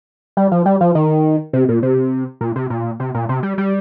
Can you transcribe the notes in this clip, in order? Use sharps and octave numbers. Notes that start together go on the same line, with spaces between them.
G3
F3
G3
F3
D#3
C3
A#2
C3
A#2
C3
A#2
C3
A#2
C3
G3
G3